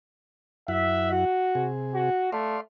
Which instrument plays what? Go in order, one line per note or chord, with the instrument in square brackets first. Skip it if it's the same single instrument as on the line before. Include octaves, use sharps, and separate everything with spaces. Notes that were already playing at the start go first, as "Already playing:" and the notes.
[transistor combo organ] F#2 E4 F#5 [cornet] E5
[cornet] F#4
[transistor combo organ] C3 G#4
[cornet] F#4
[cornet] A3 [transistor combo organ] D5 F5 C6